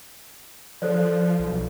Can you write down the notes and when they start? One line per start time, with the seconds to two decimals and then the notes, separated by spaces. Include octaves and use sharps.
0.82 F3 A4 C5 D5
1.39 B1